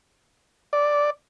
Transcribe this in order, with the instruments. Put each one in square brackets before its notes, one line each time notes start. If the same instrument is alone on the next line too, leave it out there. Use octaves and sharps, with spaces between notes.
[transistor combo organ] D5